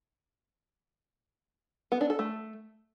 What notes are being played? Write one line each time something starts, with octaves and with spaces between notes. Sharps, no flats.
B3
D4
A4
A3